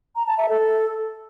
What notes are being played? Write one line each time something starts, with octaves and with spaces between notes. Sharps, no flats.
A#5
A5
E5
A4